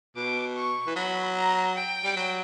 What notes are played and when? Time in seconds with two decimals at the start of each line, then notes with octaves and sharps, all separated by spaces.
0.16 B2 D6
0.56 C#6
0.87 E3
0.96 F#3 B5
1.37 A#5
1.76 G5
2.04 G3
2.16 F#3